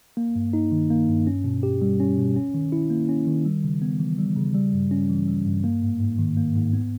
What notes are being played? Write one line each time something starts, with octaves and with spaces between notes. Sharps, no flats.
A#3
G2
D#4
D#3
A#3
G2
C#4
B2
G4
G3
C#4
B2
C#4
D#3
E4
A#3
C#4
D#3
G3
C#3
B3
E3
G3
C#3
G3
G2
C#4
E3
G3
G2
A#3
G#2
G#2
D#3
A#3
G#2
B3